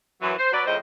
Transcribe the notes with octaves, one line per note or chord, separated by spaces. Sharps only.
F#2 E3 F#3
C5
F#3 B4 D5
F2 A2 C#3 C4 C5 D#5